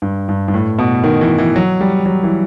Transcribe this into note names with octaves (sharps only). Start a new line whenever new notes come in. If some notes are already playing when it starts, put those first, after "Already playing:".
G2
G2
G2
A2
B2
D#3
E3
E3
F#3
G3
F#3
E3